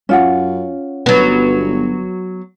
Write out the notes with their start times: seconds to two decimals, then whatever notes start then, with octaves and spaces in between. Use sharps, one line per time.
0.09 F#2 C#4 F4 F#5
1.06 G1 F#3 B3